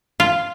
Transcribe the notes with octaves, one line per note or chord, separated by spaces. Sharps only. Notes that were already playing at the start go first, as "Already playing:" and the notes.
F4